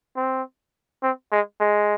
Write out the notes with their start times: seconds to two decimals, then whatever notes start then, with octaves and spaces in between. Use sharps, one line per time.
0.16 C4
1.03 C4
1.32 G#3
1.60 G#3